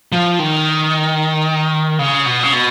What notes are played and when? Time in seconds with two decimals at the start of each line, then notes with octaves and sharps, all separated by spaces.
0.12 F3
0.39 D#3
1.99 C#3
2.26 B2
2.43 C#3
2.52 B2